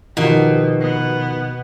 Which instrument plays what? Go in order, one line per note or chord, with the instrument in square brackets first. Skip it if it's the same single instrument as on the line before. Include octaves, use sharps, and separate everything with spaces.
[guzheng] B2 [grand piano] D#3 F3 [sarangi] G4
[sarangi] B3